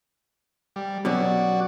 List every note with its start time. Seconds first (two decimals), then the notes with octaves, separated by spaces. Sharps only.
0.76 G3
1.05 B2 F#3 C#4 F#4 D5